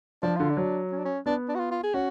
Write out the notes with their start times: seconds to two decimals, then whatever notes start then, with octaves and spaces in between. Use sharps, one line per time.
0.22 F3 D4
0.37 D3 F4
0.50 D4
0.57 F#3
0.91 C#4
0.98 D4
1.05 C#4
1.26 B3 D4
1.48 D4
1.55 F#4
1.59 F4
1.71 F4
1.83 G#4
1.94 C#4 F#4